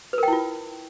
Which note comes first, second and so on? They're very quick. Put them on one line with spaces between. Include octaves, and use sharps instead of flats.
B4 A#4 G5 E4 F4